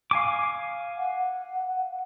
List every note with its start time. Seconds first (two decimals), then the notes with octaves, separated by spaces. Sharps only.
0.11 F5 G#5 D6
0.98 F#5